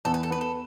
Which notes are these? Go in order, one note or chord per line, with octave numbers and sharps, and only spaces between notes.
E2 A4
B4
A4
B3 B4
A4